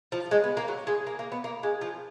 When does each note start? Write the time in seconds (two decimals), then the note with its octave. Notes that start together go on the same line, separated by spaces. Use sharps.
0.12 F3
0.31 G#3
0.44 B3
0.57 A#3
0.68 F#3
0.87 G#3
1.07 A#3
1.19 A#3
1.32 B3
1.44 A#3
1.63 G#3
1.81 F3